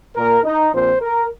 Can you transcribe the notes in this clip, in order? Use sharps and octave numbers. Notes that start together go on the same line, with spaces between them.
A#2 A#3 A#4
D#4
A#1 A#2 F3 C4 C5
A#4